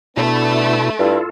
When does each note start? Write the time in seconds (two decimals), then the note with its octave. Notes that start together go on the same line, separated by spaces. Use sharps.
0.17 B2 A3 B3 D4 E4
0.99 G2 E4 F4 A4